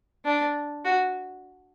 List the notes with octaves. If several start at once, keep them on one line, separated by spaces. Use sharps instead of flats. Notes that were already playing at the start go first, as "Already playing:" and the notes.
D4
F#4